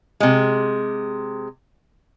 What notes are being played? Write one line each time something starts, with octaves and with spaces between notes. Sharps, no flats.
C3 G#3